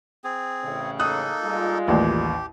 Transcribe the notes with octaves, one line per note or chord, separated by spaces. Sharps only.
C4 G#4
A1 A2 C#3
A#3 D#4 A4 D#6 F#6
G3 G#3 F4
A1 D#2 G4 D5